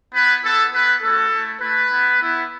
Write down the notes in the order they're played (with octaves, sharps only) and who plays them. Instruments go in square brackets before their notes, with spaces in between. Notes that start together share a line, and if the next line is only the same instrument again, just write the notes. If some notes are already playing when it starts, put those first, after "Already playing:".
[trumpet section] B3 E4 B4
B3 E4 A4
B3 E4 B4
A3 C#4 F#4 A4
A3 E4
A3 E4 B4
B3 E4
B3 E4